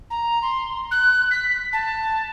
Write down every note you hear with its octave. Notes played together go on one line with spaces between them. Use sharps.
A#5
C6
F#6
B6
A5